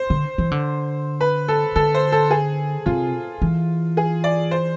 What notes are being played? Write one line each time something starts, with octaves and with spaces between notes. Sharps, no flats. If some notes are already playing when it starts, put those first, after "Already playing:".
Already playing: C5
D3
E3
D3
B4
A4
D3 A4
C5
A4
G#4
C3 F4
E3
G#4
D5
C5